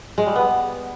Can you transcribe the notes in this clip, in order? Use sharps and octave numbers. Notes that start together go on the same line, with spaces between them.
G#3
G3
B3